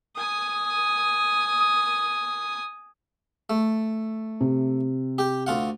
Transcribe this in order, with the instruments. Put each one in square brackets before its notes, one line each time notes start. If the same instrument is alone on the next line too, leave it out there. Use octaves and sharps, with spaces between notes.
[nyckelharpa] G#5 D#6
[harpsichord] A3
[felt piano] C3
[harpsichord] G4 G5
D2 F4 F#5